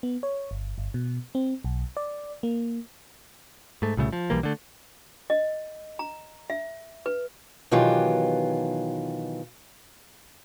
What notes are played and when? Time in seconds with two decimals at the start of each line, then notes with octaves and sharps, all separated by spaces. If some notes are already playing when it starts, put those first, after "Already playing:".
0.03 B3
0.23 C#5
0.51 G1
0.78 G1
0.94 B2
1.35 C4
1.64 B1
1.97 D5
2.43 A#3
3.82 G#2 A3
3.97 C2 A#2 C#3 A3
4.13 F3
4.30 B1 E3 G3 A#3
4.43 D3 A3
5.30 D#5
5.99 A#5
6.50 E5
7.06 B4
7.71 B2 D#3 E3 F#3 F4 G4